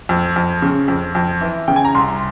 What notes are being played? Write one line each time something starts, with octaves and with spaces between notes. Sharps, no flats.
F2
F2
C#3
F2
F2
E3
C#3 G5
G#5
A#5
C2 C6